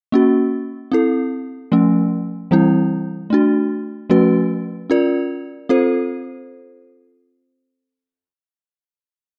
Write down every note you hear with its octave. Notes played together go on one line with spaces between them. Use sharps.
A#3 C#4 F#4
C4 E4 A4
F3 A3 C#4
E3 G3 C4 E4
A3 D4 F#4
F3 A3 C#4 F#4 B4
C#4 F4 A#4 D5
C4 F4 A4 C5